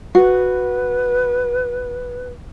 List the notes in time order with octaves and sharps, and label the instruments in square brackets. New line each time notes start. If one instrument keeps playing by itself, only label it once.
[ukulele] F#4 [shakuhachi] B4